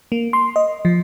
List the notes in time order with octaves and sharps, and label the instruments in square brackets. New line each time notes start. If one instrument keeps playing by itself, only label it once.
[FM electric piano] A#3
C6
D#5
F3